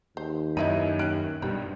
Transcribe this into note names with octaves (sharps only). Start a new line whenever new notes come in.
D#2 C5
F#2 D#4 E4 B4 B5 D#7
C#4 G4 F#6 D7
G2 B2 G4 B5